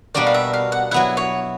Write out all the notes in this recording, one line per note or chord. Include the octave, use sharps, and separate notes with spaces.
B2 G3 A#3 D4 F#4 D5
F5
E5
F5
F#5
F#3 B3 E4 F#5
C#5